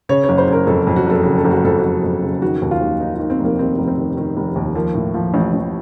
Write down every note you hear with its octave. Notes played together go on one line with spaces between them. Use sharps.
C#3 C#5
C#5
F#1
C5
C#3 A#4
F2 A4
F2
F#4
F#1 A4
C#3 F#4
A4
F#1
F#4
F2 A4
F#4
F#1
F2
C#3
D#3 F#4
D#2
F4
D#2
D#3 D#4
D#3 F4
C4
F1
A#3
D#3 C4
F1
C4
D#3
D#3
F1
D#2
F3 A#3
A2
F3
A1
A1